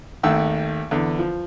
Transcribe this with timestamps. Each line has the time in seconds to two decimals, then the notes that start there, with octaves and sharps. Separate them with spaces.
0.23 G#1 D#2 A3 F#5 G5 E6
0.91 E2 D3
1.19 F3